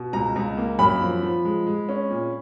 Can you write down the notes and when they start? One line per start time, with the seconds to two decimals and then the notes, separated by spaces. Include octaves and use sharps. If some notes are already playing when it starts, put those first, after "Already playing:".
Already playing: B2
0.13 C#2 A#5
0.36 C#2
0.58 A#3
0.79 F#2 B5
1.01 F3
1.23 F3
1.45 G#3
1.67 G#3
1.89 C#4
2.10 A#2